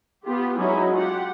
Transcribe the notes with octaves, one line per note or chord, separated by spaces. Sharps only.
B3 F4 G4
F#3 G#3 C#4 D#4 E4
F4 G4 F#5